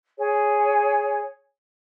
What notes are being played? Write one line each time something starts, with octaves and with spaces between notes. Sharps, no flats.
G#4 C#5